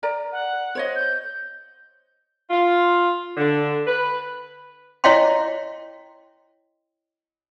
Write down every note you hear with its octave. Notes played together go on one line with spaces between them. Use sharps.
A#4 D5 A#5
F#5
C5 C#5 D#5
G6
F4
D3
B4
E4 C#5 D#5 F5 G5 C6